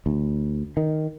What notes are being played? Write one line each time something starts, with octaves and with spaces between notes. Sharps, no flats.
D2
D#3